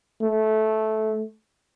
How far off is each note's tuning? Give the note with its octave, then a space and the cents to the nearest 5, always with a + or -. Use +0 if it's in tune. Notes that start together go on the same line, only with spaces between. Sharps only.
A3 -15